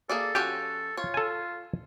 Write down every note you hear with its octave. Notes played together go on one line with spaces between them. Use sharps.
A#3 G#4 A4 D5
F3 C#4 F#4 G4
F4 C#5
A4 G#5